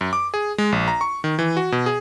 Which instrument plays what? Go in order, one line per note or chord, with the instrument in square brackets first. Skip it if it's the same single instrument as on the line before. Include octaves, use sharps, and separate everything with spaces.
[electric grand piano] F#2
D6
G#4
G#3
A#1
A#5
C#6
D#3
E3
F#4
B2
G#4